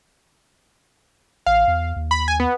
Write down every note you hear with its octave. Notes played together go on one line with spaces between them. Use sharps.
A1 F5
E2
D#2
B5
G#5
B3